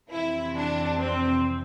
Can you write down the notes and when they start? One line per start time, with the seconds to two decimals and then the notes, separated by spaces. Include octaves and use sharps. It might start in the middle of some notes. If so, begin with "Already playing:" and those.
0.10 F2 C3 E3 E4
0.55 D4
0.99 C4